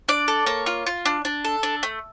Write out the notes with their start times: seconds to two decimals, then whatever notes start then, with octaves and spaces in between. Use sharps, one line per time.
0.08 D4 D5
0.28 A4
0.46 A#3 C#5
0.66 F4
0.86 F4
1.05 D4
1.25 D4
1.45 A4
1.63 D4
1.83 A3